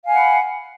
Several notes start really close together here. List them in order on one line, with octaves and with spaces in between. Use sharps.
F5 G#5 F#5 B5